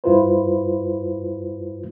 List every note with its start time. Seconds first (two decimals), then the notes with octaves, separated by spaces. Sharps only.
0.04 G2 E4 F4 B4 C5